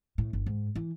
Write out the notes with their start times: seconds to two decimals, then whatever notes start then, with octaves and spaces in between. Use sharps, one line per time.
0.18 A2
0.33 G1
0.46 G#2
0.75 E3